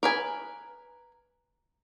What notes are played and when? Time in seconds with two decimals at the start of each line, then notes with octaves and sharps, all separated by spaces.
0.03 A#4 B4 G#5